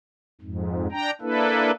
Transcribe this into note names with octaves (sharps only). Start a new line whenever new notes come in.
F2 G#2
D4 G5 A#5
A#3 D4 E4 A4 B4